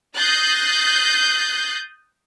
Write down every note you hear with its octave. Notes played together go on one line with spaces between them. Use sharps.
D#6 F#6 G6 A6 A#6 C7